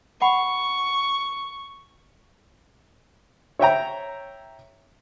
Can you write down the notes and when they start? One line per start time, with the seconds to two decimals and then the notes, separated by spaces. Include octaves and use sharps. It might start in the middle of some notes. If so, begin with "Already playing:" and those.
0.22 F#5 B5 C#6
3.59 C#5 E5 G5 A#5